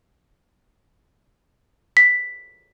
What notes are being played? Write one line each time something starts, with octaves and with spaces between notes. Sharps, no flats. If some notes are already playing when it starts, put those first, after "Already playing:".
B6